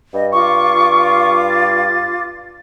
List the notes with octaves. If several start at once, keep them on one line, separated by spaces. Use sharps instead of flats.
G2 D#5
F4 C#6 D6
A6